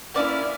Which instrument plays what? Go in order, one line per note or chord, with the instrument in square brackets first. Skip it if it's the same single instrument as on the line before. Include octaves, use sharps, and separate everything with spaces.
[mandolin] A#3 C#4 E4 D5